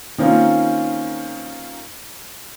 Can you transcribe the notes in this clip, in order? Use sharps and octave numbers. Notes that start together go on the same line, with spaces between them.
D#3 A#3 C4 C#4 F4